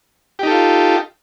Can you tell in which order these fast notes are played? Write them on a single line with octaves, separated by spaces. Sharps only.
G4 D#4 A4 F4